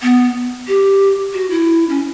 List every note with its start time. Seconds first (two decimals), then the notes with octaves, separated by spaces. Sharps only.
0.02 B3
0.68 G4
1.34 F#4
1.50 E4
1.89 C#4